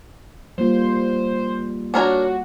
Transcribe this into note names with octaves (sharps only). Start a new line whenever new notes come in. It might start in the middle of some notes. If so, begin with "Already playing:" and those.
G3 A#3 F4 C5
D4 F#4 A#4 C#5